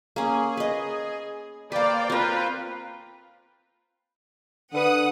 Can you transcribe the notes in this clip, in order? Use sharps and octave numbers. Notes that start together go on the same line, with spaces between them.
A#3 C#4 G#4
B4 D#5
A#3 B4 C5 D5 F5 G5
C4 F4 A#4 B4
D3 B4 F#5 D#6